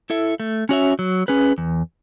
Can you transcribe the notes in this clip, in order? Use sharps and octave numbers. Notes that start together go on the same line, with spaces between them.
E4 A4 E5
A3
C#4 F#4 C#5 E5
F#3
C#4 G#4 B4
E2